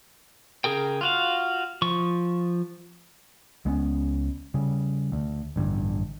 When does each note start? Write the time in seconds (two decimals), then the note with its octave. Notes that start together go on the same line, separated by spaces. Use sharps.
0.64 C#3 G#4 A#4 G5
1.01 F4 F#4 F5
1.82 F3 C#6
3.65 C#2 G#3 B3 C#4
4.54 C#3 G3
5.12 D2
5.56 A1 G2 D3